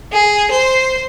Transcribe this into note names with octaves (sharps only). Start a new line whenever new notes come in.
G#4
C5